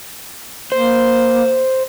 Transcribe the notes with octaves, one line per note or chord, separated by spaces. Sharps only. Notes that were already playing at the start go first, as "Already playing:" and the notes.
A#3 C5